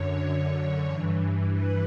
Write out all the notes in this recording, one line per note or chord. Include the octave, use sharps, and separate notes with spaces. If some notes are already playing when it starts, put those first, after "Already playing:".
Already playing: F#2 D3 C#5
G2 E3
B4